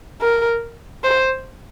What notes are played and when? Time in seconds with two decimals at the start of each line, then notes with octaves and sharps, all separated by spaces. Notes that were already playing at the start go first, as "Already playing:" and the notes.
0.21 A#4
1.04 C5